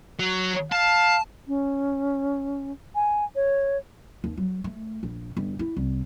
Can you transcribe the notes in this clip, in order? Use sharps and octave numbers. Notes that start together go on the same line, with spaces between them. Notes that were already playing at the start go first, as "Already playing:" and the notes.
F#3
F5 A5
C#4
G#5
C#5
D#2
F#3
A3
A#1
G1
E4
C2